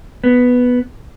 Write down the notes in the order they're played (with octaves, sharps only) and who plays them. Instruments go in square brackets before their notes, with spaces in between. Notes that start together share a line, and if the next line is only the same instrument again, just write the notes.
[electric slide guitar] B3